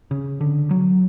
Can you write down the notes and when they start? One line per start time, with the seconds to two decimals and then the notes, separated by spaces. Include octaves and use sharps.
0.11 C#3
0.41 D3
0.71 F#3